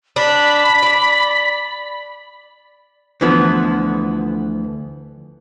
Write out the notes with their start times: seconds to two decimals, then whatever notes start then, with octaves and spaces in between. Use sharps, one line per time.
0.16 D4 B5
0.83 D5
3.21 D2 D3 E3 F3 B3